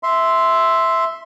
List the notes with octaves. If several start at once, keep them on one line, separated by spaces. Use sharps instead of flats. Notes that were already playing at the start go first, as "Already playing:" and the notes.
E5 C6